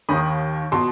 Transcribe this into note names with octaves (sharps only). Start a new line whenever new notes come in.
D#2 D#3 B5 D#6
B2 A5 C6